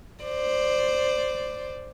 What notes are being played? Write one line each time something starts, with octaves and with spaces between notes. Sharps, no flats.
C5 D5